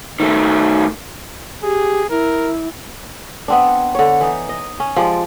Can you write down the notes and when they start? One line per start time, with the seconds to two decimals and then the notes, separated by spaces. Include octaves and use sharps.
0.20 D#3 A3
1.63 G4 G#4
2.10 E4 A#4
3.48 B3 C4 D4
3.95 D3 C#5
4.21 E3 D#4
4.49 D#5
4.80 C#4
4.96 F3 G#3 G4 D5